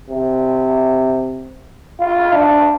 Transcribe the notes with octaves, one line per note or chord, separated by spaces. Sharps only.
C3
F4
D4